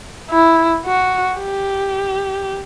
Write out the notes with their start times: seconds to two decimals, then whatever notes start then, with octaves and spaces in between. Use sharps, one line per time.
0.31 E4
0.85 F#4
1.39 G4